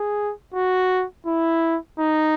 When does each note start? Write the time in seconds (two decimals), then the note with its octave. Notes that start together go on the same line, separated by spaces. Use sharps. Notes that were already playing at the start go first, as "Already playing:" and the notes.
Already playing: G#4
0.54 F#4
1.27 E4
1.99 D#4